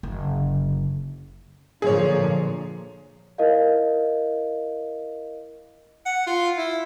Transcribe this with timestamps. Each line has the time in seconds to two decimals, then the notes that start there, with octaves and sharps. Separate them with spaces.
0.03 F#1 D3
1.82 A#2 D3 F3 G#4 C#5
3.38 E4 A#4 D#5 F5
6.06 F#5
6.27 F4
6.57 E4